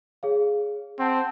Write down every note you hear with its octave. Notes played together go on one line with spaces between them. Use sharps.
G#4 C#5 F5
C4 F#5 A5